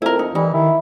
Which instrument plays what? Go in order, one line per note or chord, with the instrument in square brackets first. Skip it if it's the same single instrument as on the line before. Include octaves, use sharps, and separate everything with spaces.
[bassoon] F2 [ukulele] E4 A#4
[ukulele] D#4
[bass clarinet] E3 [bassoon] G3 [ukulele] D#4
[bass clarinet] D#3 [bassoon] E4